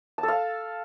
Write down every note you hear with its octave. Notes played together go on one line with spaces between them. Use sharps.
A5
A4
F5